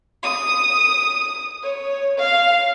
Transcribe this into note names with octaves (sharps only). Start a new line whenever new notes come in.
D#6
C#5
F5